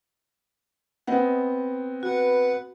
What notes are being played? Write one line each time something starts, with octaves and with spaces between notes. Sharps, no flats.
B3 C4 D#5 F#5
F#4 B4 F#5